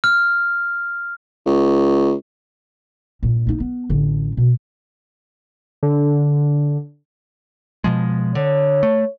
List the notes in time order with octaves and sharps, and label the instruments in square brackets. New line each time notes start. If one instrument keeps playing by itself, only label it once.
[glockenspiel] F6
[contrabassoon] C#2
[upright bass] G2 A#2
A#3 D#4
B3
A1 D3
B2
[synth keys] D3
[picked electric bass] B2 F3 G#3
[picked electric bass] D3 [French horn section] C#5
[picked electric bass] A3